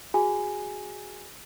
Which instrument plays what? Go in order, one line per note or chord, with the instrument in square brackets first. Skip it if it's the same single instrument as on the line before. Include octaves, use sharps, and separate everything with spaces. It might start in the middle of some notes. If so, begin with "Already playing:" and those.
[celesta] F#4 G#4 G#5